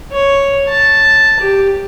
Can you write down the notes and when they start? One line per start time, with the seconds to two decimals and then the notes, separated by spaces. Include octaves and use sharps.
0.12 C#5
0.68 A5
1.40 G4